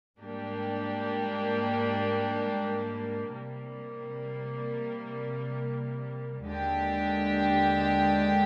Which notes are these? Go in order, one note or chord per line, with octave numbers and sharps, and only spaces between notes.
G#2 G3 A#3 D4 G4
C3 G3 A#3
D#2 D3 G#3 D4 G4